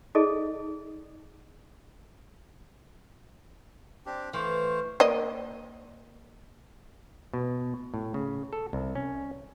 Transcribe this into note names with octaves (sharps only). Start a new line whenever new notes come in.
D#4 G#4 A4 D5 D#5
C4 D4 G4
E3 A3 C5 F5
A#3 D5 D#5
B2
A2
C#3
A4
C2
C#4